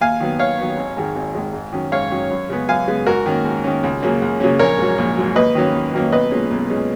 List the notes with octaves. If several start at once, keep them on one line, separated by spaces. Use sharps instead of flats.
D#2 F5 G#5
D#3 F#3 B3
D#2 C#5 F5
D#3 F#3 B3
G#1
G#2 D#3 G#3
G#1
G#2 D#3 G#3
G#2
D#3 F#3 C#4
G#2 C#5 F5
D#3 F#3 C#4
F#2
C#3 G#3 B3
F#2 F5 G#5
C#3 G#3 B3
G#2 F#4 A#4
D#3 A#3 C#4
G#2
D#3 A#3 C#4
C#2
C#3 F#3 A#3 C#4
C#2
C#3 F#3 A#3 C#4
A#1 A#4 C#5
G#2 F#3
A#1
G#2 F#3
D#2 B4 D#5
D#3 F#3 A#3 C#4
D#2
D#3 F#3 A#3 C#4
B1 B4 D#5
A#2 G#3 C#4
B1
A#2 G#3 C#4